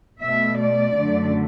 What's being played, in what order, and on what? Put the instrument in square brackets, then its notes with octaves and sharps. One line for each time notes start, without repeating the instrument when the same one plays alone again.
[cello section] B2 A3 E5
D5
F#2 D3 F#3 A3